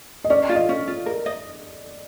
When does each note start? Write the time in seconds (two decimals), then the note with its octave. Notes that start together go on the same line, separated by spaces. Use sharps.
0.24 D#5
0.30 C#4 D5
0.49 F4
0.55 D#5
0.69 C#4
0.88 F4
1.06 A#4
1.26 D#5